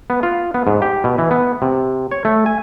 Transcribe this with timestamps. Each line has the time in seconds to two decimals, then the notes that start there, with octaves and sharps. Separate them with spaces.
0.10 B3
0.23 F4
0.54 B3
0.67 G#2
0.82 G4
1.04 B2
1.18 E3
1.31 B3
1.62 C3
2.11 C#5
2.25 A3
2.46 G#5